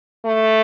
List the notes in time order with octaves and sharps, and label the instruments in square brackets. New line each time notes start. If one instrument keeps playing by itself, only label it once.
[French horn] A3